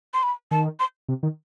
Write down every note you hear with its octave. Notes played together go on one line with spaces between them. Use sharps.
C6
B5
D#3 A5
C6
C3
D#3